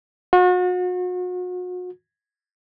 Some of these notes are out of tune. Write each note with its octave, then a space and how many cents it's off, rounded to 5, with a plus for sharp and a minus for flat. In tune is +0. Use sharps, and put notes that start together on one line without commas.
F#4 -40